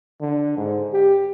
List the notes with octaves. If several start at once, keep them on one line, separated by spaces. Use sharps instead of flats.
D3
G#2
G4